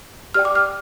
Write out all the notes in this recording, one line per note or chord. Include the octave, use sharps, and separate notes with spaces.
G4 D5 G5 F6
D6
F6